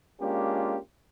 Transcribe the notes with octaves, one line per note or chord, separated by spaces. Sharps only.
G#3 A#3 C#4 D4 F4 G4